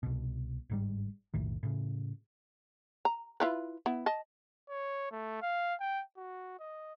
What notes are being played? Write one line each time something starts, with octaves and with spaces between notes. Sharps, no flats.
C2 B2
G1 G#2 G3
F1 B1 A2 D#3
A2 C#3
A#5
E4 F4 B4
B3 E4
D#5 A5
C#5
A3
F5
G5
F#4
D#5